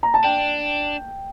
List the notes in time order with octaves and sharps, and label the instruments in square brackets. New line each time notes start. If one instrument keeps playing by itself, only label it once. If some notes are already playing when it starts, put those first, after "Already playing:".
[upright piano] A#5
A5
[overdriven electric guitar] D4 [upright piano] G5